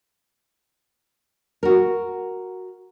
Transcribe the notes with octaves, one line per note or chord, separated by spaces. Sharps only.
F#4 A#4